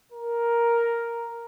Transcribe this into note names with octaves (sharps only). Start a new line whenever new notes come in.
A#4